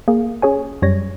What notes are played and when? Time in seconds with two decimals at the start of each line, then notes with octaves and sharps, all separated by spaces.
0.08 A#3 G#4
0.42 C#4 G#4 C#5 G#5
0.82 F#2 G3 C#5 A#6